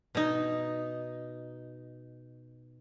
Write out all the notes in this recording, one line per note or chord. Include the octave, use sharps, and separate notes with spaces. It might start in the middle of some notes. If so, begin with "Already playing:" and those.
B2 D#4